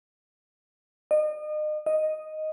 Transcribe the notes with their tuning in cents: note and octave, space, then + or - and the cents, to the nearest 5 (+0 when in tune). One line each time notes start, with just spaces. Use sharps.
D#5 -35
D#5 +0